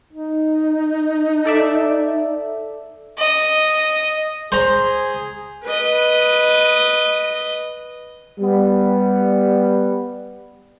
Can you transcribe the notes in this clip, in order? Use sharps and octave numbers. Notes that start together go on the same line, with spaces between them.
D#4
A4 D5 E5
D#5
G#4 C5 A#5
B4 D#5
G3 B3